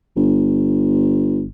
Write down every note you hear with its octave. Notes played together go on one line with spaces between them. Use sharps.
G1